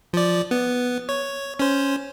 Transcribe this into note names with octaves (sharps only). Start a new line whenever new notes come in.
F3 D5
B3
C#5
C#4 C5